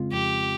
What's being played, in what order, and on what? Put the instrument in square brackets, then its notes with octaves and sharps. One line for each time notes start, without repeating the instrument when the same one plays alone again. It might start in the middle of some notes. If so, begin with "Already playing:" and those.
Already playing: [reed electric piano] F2 C#3 G#3 C4 F4
[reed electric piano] F2 [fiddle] G4